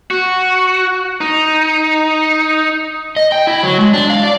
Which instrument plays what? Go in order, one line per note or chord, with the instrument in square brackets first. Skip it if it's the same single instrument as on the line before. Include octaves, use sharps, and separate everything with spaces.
[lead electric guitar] F#4
D#4
[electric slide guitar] D#5
G5
E4
F#3
G#3
D4
F5
D5